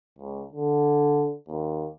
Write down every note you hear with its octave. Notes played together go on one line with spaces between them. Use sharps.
C#2
D3
D#2